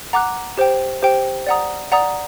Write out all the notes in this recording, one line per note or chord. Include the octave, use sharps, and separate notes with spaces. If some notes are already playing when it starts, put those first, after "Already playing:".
F#5 A#5 D6 F#6
G4 C5 G5
G4 C5 G5
D5 F#5 A#5 D#6
D5 F#5 A#5 D#6